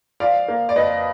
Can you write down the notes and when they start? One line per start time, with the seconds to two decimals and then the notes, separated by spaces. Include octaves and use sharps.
0.20 F3 D5 F5
0.48 A#3
0.69 D5
0.76 F2 B4 D#5